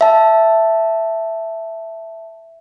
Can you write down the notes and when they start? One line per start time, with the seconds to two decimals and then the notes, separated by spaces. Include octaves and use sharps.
0.01 E5 A5